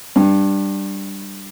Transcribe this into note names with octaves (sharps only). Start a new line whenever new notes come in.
G2